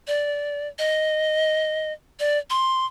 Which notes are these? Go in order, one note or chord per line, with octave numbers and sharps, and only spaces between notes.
D5
D#5
D5
C6